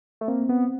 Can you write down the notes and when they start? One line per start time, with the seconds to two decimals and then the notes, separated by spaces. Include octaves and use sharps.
0.21 A3
0.28 A#3 C4
0.49 B3